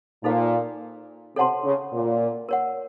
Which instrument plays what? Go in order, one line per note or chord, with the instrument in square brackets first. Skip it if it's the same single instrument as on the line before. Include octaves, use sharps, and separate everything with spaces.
[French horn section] A#2 [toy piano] D#4 A4 C5 F5
[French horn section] C3 [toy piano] A4 C#5 F#5 A5 C6
[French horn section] C#3
A#2
[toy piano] A#4 C#5 F#5